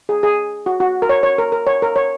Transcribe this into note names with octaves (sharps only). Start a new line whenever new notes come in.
G#4
G#4
F#4
F#4
A#4
C#5
C#5
A#4
A#4
C#5
A#4
C#5